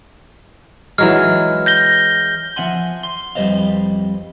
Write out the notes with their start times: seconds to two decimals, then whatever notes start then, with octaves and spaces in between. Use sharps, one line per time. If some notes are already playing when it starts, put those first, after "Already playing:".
0.98 E3 F#3 G#3 F6
1.66 G6 A#6 G7
2.56 F3 A3 E5 F#5 G#5 C6
3.03 C6
3.35 F2 G3 B4 C5 D#5 F5